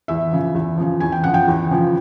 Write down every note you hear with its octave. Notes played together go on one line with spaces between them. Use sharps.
E2 E5
C#3 F3
E2
C#3 F3
E2 G#5
G5
C#3 F3 F#5
G5
E2
C#3 F3